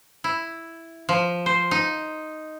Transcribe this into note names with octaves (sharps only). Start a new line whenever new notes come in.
E4
F3
C5
D#4